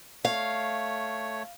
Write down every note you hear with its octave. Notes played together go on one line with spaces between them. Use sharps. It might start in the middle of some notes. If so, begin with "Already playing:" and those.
A3 C#5 F5